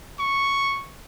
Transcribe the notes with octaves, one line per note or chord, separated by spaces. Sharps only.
C#6